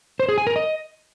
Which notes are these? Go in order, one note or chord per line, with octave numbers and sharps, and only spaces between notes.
C5
G#4
G#5
A#4
D#5